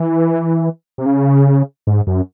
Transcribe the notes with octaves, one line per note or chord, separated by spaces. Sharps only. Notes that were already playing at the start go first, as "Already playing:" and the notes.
Already playing: E3
C3
C#3
G#2
F#2